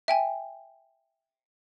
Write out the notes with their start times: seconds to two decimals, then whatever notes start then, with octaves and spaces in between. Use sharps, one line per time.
0.08 E5 G5 G#5